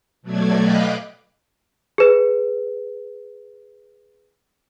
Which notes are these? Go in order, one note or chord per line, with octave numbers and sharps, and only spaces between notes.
B2 F#3 A3 D5 G#6
D#5 F5 G5 B5 D6 F#6
G#4 B4